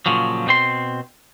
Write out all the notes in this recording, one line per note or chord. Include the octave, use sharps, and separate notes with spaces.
A#2 C#3 F3 F#3
B2 C4 C6